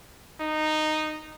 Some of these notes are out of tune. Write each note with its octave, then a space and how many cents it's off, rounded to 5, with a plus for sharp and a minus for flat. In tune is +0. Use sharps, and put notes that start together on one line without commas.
D#4 -10